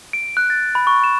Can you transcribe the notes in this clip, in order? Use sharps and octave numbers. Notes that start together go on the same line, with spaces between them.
D7
F#6
A6
B5
C#6
E7